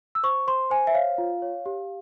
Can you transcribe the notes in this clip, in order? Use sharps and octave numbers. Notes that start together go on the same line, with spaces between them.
E6
C5 C#6
C5 C6
C5 G#5
E5
C#5 F5
F4
C#5
G4